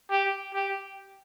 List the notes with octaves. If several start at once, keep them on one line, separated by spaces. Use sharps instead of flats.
G4
G4